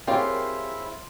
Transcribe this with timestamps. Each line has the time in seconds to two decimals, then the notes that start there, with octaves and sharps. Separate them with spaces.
0.07 C4 E4 F4 G4 G#4 A#4 C#5 F5